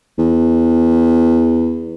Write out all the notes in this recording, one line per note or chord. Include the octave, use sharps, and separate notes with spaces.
E2